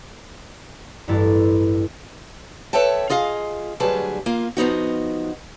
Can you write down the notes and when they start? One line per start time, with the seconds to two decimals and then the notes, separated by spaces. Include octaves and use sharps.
1.08 A1 G2 E4 A6
2.73 A4 B4 C#5 E5 G5 A5
3.10 F4 G#4 D#5 F5
3.80 D2 F#3 G3 G#4 B4 A5
4.26 A#3 F4
4.57 F3 B3 D#4 F#4